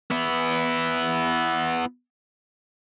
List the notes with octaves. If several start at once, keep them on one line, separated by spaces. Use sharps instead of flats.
B3 E4